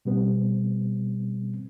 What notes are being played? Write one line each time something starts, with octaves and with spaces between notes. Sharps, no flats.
B2 G3 B3 C4